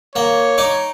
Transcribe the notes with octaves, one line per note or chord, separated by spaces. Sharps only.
A#3 C#5
D#4 D6